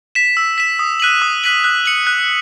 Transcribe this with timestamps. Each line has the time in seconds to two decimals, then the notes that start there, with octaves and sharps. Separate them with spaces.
0.15 B6 E7
0.37 E6
0.58 B6 E7
0.79 D#6
1.00 F#6 B6 D#7 F#7
1.22 D#6
1.44 F#6 B6 D#7 F#7
1.64 F#6
1.85 C#7 F#7
2.07 F#6